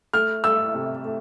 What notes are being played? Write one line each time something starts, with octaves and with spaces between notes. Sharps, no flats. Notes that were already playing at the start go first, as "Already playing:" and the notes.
A3 F6
A3 E6
C3
A3